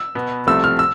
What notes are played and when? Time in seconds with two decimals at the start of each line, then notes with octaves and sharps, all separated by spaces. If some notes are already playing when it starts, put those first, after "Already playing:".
Already playing: E6
0.15 B2 B3
0.47 C2 C3 F3 A3 E6
0.64 F6
0.79 E6